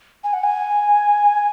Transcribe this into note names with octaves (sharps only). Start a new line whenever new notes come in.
G#5
F#5
G#5